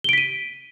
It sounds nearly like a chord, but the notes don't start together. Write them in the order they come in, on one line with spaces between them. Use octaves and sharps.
G7 D7 B6 D#7